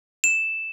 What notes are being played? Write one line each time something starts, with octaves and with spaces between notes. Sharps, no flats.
E7